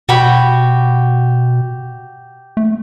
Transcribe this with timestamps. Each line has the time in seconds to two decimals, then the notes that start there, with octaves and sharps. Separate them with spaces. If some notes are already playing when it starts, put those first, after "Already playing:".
0.09 B2 F#4 G4 B5
2.57 A3